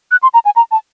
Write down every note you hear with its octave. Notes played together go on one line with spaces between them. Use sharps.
F#6
C6
A#5
G#5
A#5
A5